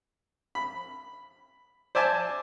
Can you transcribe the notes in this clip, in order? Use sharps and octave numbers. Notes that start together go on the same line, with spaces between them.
B5
C5 D5 E5 G#5 A5